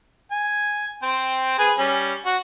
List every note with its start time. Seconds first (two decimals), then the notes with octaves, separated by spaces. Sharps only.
0.31 G#5
1.03 C4 C5 G5
1.59 G#4 B4 G#5
1.78 G3 C#4
2.25 F#4